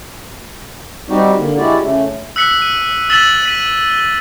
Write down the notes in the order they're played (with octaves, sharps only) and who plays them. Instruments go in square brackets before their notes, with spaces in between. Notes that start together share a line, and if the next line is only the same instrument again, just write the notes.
[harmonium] G3 C4 D#4 F#4 G4
D3 A#3
G#3 E4 F#4 G4 D5
C#3 A3
[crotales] E6 F#6 B6 C#7
D#7
E6 A6 B6 E7 F#7 G7
B6 D#7
G7